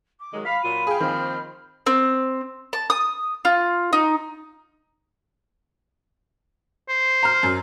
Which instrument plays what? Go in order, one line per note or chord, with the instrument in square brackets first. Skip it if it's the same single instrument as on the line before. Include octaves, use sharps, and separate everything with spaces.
[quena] D6
[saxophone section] D#3 F#3 G#3
[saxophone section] F5 [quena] B5 [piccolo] B6
[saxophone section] A#2 F#3 F4 [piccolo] D#7
[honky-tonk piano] G#4 G5 [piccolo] F5
[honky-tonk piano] D#3 [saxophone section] F3 A#3 C4 [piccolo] F6
[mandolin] C4
A5
D#6
F4
D#4
[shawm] C5
[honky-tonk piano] A#5 F6
F#2